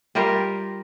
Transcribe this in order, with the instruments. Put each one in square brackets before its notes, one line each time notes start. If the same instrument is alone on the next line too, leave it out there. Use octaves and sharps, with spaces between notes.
[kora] G3 F4 G4 A#4